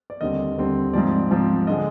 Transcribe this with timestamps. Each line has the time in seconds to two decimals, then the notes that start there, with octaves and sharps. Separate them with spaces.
0.10 D5
0.21 D#2 D3 G3 C4 D#5
0.57 D#2 D3 G3 C4
0.93 G#2 F3 C4 D5
1.31 G#2 F3 C4
1.67 D3 G#3 D#5